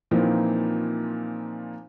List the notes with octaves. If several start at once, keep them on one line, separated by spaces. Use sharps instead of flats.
A#2 E3 F3 A#3 C4 D#4